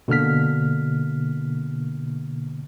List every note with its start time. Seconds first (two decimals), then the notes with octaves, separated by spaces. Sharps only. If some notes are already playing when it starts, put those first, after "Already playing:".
0.08 B2 D3 A#3 F6 B6